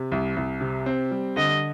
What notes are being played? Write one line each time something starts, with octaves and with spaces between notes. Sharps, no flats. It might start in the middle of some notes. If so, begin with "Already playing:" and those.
Already playing: C3
C2
C2
C3
C4
G3
D3 D#5